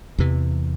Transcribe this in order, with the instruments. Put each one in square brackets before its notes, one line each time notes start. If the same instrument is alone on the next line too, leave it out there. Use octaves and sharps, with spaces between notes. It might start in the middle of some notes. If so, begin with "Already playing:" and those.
[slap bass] E2 C3 E3